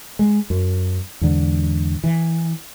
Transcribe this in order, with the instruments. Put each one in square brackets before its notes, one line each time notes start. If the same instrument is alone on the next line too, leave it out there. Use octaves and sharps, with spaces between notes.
[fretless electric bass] G#3
F#2
E2 G#2 D3
E3